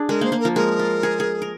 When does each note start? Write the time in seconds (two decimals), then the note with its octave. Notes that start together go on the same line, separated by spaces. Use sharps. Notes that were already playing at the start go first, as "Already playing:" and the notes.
Already playing: D4 G#4
0.09 G#3 A#4
0.21 A#3 C5
0.32 A#3
0.40 A#4
0.45 F3
0.56 G#3 A#4
0.79 F4
1.03 G#4
1.20 G#4
1.42 A#4